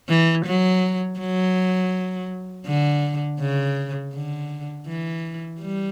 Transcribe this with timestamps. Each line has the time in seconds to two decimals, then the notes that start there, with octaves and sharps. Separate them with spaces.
0.09 E3
0.46 F#3
1.19 F#3
2.66 D3
3.40 C#3
4.13 D3
4.87 E3
5.61 G3